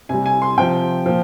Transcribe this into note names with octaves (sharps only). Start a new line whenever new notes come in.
C3 G3 G#5
G#5
C6
C3 F3 G5
A#2 F3